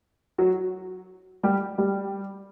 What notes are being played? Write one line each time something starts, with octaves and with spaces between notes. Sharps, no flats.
F#3 F#4
G3 G4
G3 G4